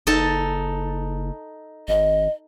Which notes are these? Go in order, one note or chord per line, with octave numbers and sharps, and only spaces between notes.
F#1 D#4 A4 A5
G#1 D#5